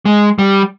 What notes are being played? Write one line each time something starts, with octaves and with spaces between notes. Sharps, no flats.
G#3
G3